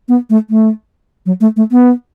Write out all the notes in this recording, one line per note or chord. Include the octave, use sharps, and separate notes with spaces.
B3
A3
A3
F#3
A3
A3
B3